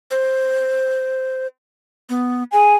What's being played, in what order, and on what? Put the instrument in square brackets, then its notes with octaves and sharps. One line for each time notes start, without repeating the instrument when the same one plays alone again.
[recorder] C5
B3
[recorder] G#4 [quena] G#5